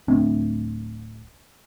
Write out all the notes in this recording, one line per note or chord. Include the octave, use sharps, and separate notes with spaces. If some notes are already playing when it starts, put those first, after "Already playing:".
D1 A3 C4 D4